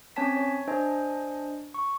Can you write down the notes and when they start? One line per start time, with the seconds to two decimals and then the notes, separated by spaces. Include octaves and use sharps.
0.16 C4 C#4 C#5 G#5 A5 B6
0.37 C#5
0.68 D4 C5 D#5 G#5
1.74 C#6